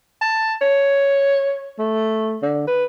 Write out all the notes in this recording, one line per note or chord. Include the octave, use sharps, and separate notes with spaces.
A5
C#5
A3
D3
B4